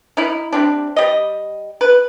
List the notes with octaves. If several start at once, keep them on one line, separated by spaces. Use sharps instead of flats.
D#4 E4
G3 C4 D4
G3 D#5
B4